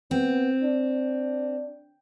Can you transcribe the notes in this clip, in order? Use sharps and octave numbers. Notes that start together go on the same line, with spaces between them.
B3 C4
D4